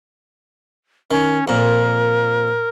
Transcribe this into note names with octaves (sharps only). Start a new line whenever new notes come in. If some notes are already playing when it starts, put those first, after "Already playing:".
D#3 C#4
F2 A#2 A#4